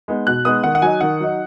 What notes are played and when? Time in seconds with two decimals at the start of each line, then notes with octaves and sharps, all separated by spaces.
0.08 G#3 B3 D#4
0.27 B2 F#6
0.45 G#3 B3 D#4 D#6
0.64 D#3 F#5
0.75 F#5
0.82 F#3 D#4 G#5
1.01 D#3 F#5
1.20 F#3 D#4